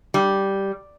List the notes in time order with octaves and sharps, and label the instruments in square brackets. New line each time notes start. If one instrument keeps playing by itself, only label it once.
[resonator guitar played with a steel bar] G3